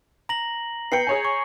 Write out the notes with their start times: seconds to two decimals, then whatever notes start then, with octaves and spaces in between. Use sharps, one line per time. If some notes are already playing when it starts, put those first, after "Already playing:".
0.29 A#5 A#6 F#7
0.92 B3 G5 G6 C7 C#7
1.07 G#4 C#5 G#5
1.25 C#6